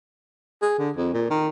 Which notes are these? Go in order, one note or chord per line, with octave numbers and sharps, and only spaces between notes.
G#4
D3
F2
A#2
D#3